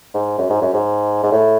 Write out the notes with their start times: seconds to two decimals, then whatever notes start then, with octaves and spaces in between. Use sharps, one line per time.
0.14 G#2
0.39 F#2
0.50 G#2
0.62 F#2
0.73 G#2
1.23 G#2
1.32 A2